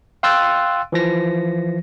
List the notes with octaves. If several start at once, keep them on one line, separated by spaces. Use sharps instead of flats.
F5 G5 C6 E6 F#6 A6
E3 F3 A#6